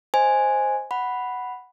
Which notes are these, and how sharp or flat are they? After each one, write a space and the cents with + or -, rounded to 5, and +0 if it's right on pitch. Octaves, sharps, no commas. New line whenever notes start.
C5 +0 D#5 +0 G#5 +0
F#5 +0 B5 +0